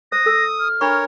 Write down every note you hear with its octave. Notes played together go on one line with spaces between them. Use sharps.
C5 D#6 A#6
A4 E6
F6
D4 A#4 C#5 B5 C#6